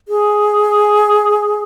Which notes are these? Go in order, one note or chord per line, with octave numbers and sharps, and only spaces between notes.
G#4